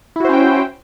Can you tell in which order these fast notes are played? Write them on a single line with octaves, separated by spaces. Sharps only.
E4 F#4 C5 C#4 G5